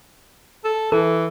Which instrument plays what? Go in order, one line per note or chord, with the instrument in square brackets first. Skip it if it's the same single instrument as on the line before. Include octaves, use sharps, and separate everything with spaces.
[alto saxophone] A4
[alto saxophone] E3 [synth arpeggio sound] A4